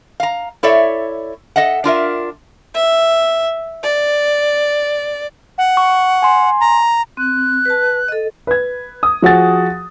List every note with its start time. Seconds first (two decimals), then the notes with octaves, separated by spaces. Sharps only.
0.20 F5 A#5
0.63 E4 A4 C#5 D5 E5
1.56 A4 D#5 E5 F#5
1.84 D4 F4 A#4 E5
2.74 E5
3.83 D5
5.58 F#5
5.77 C#6
6.22 G#5 C6
6.61 A#5
7.17 C4 F#6
7.65 B4 A5
8.08 A4 D#5
8.47 B4 G#6
9.03 D#6
9.22 F3 F#4 G#4 A6